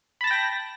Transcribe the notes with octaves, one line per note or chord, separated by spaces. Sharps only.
G5 A5 B5 A#6